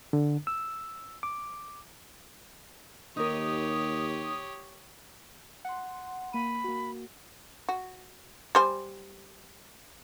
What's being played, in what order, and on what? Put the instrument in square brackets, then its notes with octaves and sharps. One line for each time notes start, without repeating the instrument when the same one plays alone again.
[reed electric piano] D3
E6
D6
[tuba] D#2 [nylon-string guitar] D#4 A#4 [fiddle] G4 C#5 [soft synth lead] D#6
[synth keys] F#5 C6
[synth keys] A#3 D#7 [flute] B5
[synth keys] A#3 F#4
[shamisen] F#4
G3 C5 G#5